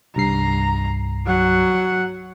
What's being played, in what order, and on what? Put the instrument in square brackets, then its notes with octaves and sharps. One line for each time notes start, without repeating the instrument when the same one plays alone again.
[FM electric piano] C2 G2 C7 [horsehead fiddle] A#5
[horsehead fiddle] F#3 F#5